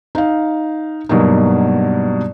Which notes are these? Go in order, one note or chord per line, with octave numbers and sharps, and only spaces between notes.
D#4 F5
G2 B2 F#3 A#3 D#4